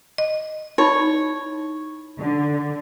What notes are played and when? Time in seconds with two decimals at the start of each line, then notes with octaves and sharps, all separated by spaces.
0.18 D#5
0.78 D#4 E4 C#5 B5
2.18 D3